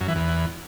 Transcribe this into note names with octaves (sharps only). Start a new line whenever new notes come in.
F#2
E3
E2